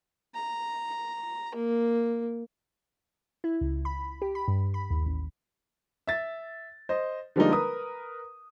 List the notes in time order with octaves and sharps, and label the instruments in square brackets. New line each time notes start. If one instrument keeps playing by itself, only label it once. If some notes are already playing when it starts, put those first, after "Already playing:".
[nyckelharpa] A#5
A#3
[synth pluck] E4
C#2
B5
G4
B5
G2
B5
D#2
A1
[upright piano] E5 A6
C5 D#5
D3 F3 G3 G#3 A#3 D#4
A#4 B4 D#6